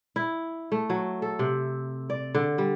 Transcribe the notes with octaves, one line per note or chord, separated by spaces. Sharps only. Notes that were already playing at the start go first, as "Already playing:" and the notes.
E4
A3
F#3
A4
C3
D5
D3
G3